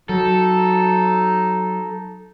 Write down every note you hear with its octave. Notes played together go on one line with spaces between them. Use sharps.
F#3 D#4 A4